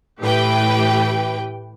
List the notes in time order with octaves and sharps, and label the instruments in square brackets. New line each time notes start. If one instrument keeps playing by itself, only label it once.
[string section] A2 E3 G4 B4 G5